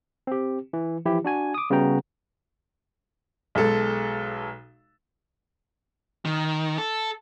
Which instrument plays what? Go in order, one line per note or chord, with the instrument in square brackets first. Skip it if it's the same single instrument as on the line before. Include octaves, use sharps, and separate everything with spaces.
[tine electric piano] C4 G4
E3
E3 F3 E4 G4
D4 F#4 G#5 G#6
D6 D#6
C#3 G3 B3 F#4 G5 A#5
[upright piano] B1 G#3 A4
[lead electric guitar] D#3
A4